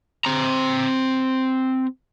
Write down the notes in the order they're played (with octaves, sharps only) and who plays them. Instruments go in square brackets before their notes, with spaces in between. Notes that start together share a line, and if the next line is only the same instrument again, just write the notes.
[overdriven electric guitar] C4 A#5